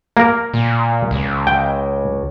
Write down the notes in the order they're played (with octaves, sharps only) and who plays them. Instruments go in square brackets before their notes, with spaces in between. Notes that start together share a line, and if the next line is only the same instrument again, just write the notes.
[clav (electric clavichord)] A#3 A#4
[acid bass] A#2
C#2
[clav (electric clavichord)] G5